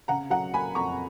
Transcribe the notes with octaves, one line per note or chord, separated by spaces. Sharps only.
C#3 F#5 A#5
F#3 F#5 A#5
A#3 G#5 B5
F2 A#5 C#6